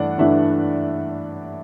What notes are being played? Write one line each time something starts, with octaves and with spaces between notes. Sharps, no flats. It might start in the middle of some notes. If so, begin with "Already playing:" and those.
Already playing: G2 E3 A3 D4 D5 F#5
G2 E3 A3 D4 E5